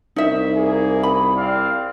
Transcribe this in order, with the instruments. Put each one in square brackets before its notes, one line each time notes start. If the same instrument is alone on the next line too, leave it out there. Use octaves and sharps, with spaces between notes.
[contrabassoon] C2 [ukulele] D#4 E5
[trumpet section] A#3 G#4
[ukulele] B5
[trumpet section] C4 D5 F5